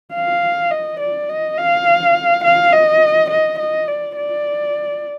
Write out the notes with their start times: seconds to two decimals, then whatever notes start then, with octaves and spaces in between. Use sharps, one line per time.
0.15 F5
0.71 D#5
1.00 D5
1.29 D#5
1.58 F5
2.44 F5
2.73 D#5
3.30 D#5
3.59 D#5
3.88 D5
4.17 D5